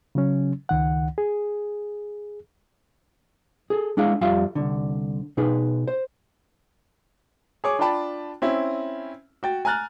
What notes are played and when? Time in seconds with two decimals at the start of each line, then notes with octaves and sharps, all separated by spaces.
0.15 C#3 F#3 C#4
0.69 C#2 D#3 F#5
1.18 G#4
3.70 G#4 A4
3.97 G#3 D4 E4 G#4 F5
4.21 F2 G3 F4 E5 F5
4.55 C2 D3
5.37 B2 D#4 G#4 B4
5.88 C5
7.64 G#4 C#5 D6
7.79 D4 F4 D5 G5 A5 B5
8.42 C4 C#4 E4
9.43 F#4 G5 A6
9.65 G#5 A#5 F6 F#6 A6